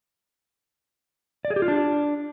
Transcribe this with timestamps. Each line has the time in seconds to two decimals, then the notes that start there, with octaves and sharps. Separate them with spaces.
1.45 D5
1.50 G#4
1.56 G4
1.62 F4
1.68 D4